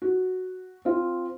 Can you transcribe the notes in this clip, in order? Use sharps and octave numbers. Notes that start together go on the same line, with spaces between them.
F#4
C4 F4